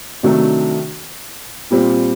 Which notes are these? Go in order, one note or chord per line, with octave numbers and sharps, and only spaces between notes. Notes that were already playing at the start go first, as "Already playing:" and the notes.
C3 D#3 F#3 A3 D4
A#2 G3 C4